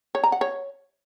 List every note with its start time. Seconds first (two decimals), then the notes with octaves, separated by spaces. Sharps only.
0.15 C#5
0.24 A#5
0.32 F#5
0.41 C#5